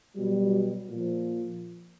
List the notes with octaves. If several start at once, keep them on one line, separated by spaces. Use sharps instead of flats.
B2 F#3 G3
A#2 F3